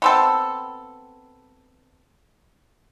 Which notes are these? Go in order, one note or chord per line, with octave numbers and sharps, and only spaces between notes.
B3 C4 A4